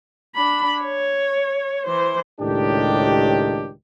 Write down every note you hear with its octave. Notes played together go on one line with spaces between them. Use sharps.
D4 B5
C#5
E3 C5
C#2 A2 D#3 D4 G4